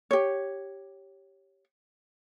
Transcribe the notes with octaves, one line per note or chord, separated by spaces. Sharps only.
G4 C#5